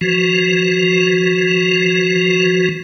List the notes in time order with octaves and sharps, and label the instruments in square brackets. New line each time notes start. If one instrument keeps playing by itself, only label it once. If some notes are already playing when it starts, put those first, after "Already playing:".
[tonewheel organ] E3 F3 F#4